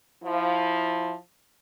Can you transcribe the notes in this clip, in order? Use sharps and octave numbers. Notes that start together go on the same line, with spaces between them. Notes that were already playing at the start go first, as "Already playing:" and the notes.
F3 E4